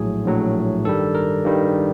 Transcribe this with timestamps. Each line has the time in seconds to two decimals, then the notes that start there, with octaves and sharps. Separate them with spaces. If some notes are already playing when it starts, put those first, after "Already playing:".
Already playing: A#1 A2 F#3 G#4
0.25 A#1 A2 F#3
0.85 G2 D#3 G3 A4
1.15 A#4
1.45 G2 D#3 G3